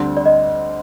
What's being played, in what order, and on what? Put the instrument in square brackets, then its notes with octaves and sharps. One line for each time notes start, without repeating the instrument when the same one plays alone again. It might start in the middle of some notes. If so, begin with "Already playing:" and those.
Already playing: [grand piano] D2 D3 G3 C4 [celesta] D5
[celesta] D5
D#5